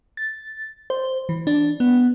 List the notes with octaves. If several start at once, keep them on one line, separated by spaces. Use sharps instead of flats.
A6
C5
E3
D4
B3